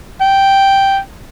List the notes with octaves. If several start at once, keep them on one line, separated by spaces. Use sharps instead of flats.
G5